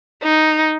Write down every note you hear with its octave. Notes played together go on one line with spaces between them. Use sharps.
D#4